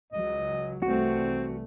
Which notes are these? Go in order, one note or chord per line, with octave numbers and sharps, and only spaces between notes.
C#2 F#3 D#5
C2 E3 A3 C4 F#4